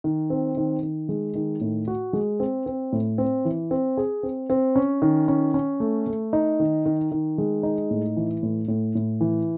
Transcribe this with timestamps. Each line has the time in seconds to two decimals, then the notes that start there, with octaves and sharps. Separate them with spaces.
0.04 D#3
0.30 C4
0.57 D#3
0.82 D#3
1.09 G#3
1.35 D#3
1.61 A2
1.87 F#4
2.13 G#3
2.40 C4
2.66 C4
2.92 A2
3.18 C4
3.45 E3
3.71 C4
3.97 G#4
4.23 C4
4.50 C4
4.76 C#4
5.02 D#3
5.28 C#4
5.54 C#4
5.80 A3
6.07 A3
6.33 D#4
6.60 D#3
6.86 D#3
7.12 D#3
7.38 G#3
7.63 D#4
7.90 A2
8.17 E3
8.43 A2
8.68 A2
8.95 A2
9.21 E3